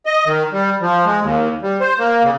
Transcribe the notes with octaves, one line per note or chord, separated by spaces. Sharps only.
D#5
D#3
G3
F3
G#3
D#2
G3
C5
A#3
C#3